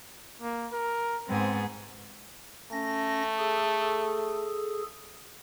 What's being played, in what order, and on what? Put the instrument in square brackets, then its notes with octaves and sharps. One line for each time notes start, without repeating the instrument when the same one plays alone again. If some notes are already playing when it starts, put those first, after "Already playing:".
[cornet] A#3
A#4
[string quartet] G#2 B3 G#4 [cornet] C4
[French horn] A3 [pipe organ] C#4 A#6
[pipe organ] G#4 A4